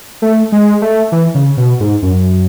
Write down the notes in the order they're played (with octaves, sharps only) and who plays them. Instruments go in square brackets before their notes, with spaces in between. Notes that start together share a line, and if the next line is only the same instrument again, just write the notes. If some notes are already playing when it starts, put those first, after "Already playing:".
[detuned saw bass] A3
G#3
A3
E3
C#3
B2
G#2
F#2